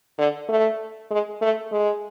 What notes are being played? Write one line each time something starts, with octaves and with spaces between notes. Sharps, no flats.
D3
A3
G#3
A3
G#3